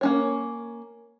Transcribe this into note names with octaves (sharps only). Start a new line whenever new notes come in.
A#3 C#4 C#5